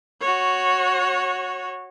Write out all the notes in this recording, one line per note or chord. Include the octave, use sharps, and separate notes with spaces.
F#4 C#5